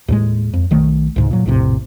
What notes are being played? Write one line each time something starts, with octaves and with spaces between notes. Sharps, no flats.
D#2 A2 G#3
F2
B1 D#3 A3
C#2 G#2 C#3
A#2 F#3
A#1 F2 A2 C3